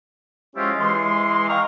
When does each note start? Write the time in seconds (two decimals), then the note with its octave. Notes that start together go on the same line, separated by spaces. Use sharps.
0.56 F3 G#3 C#4 E4 F4 G4
0.79 E3 G#3 C6
1.49 D#5 F5 G5 A#5 C#6 F6